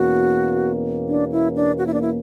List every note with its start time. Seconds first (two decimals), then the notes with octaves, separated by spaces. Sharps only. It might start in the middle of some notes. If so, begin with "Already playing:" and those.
Already playing: E2 B2 A#3 C#4 F#4
1.08 D4
1.32 E4
1.56 D4
1.78 F#4
1.87 E4
1.94 D4
2.01 E4